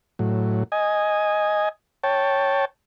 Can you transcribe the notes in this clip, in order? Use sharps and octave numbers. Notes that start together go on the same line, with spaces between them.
A2 F#3
D#5 G#5
C#5 G5 A5